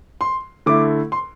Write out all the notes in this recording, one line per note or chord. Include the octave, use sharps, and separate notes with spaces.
C6
D3 A3 E4 D6
C6